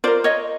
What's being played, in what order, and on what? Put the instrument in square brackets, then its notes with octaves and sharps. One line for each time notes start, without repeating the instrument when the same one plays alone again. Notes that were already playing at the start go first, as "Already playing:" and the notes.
[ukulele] F4 A#4 C5 D5
C#5 D#5